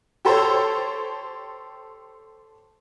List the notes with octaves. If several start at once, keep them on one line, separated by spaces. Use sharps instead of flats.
G4 A4 C5 C#5 A5